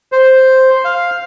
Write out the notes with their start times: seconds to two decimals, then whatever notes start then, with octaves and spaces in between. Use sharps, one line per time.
0.12 C5
0.85 F5